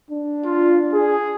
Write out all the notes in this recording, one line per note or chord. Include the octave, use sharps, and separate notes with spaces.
D4
F4
G#4